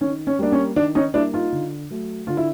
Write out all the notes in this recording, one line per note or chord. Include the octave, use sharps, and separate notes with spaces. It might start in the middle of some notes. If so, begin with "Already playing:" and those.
D#3 C#4
C#4
G3 A#3 D4
C#4
D#3 D4
C#4 D#4
G3 A#3 D4 E4
D#4 F4
D3
F#3 A3
D3 F4
E4